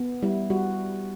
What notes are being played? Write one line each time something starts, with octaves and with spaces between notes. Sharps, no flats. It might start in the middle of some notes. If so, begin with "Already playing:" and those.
Already playing: B3
G3 E4
G3 F#4